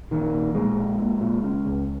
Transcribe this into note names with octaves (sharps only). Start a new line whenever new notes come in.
A#1 D#3
A#2
A#2 G#3
A#1
A#2
A#2
C#3
C#2